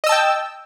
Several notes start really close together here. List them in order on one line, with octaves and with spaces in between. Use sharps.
D#5 E6 A5 G5